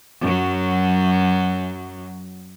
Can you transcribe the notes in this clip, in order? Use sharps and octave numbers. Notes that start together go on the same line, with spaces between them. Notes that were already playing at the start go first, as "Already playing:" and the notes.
F#2 F#3